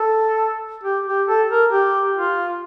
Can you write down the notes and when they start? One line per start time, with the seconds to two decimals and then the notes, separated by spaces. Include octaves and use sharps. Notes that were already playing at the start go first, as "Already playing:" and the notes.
Already playing: A4
0.83 G4
1.06 G4
1.27 A4
1.50 A#4
1.72 G4
2.16 F4